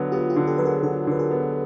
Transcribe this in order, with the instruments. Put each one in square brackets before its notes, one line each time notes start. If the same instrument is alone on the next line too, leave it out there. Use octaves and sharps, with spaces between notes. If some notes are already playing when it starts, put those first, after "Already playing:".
Already playing: [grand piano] D3 F#3 B3
[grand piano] B3 [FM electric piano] F4 G4
[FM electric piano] F4 G4
[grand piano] D3
[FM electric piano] G4 A4
[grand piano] F#3 [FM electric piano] B4
[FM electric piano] G#4 A#4
[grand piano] D3 [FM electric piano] A4 B4
[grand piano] D3 [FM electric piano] B4
[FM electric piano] G#4 A#4
[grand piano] B3